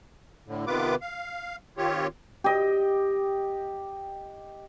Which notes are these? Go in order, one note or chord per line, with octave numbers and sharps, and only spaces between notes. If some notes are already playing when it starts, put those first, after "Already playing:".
A2 D3
C3 D#3 B3 F4 B4 D6
F5
D#3 C4 F4 G4 C#5
G4 D#5